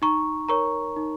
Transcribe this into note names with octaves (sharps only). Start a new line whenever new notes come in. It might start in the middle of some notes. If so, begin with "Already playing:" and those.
D#4 A#5 C#6
A#4 C#5 A#5 C#6
D#4